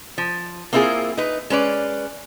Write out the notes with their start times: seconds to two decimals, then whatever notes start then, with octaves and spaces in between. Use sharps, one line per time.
0.18 F3
0.73 A#3 C4 E4 F4 G#4
1.17 D#4 B4
1.50 G#3 C#4 B4 D5